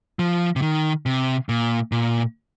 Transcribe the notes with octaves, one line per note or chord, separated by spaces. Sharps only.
F3
C3
D#3
C3
A#2
A#2